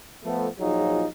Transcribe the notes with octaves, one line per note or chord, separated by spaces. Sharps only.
F3 A3 B3
A#1 F3 F#3 D#4 F4 G#4